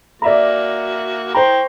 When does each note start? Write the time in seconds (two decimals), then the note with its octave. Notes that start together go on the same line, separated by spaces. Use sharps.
0.22 A#3 F#4 D5 E5 A#5
1.34 C5 G5 A#5 C#6